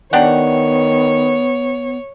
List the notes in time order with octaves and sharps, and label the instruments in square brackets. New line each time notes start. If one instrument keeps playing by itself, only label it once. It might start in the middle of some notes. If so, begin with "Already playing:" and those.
[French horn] D#3 [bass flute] B3 [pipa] D4 G4 F#5 [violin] C#5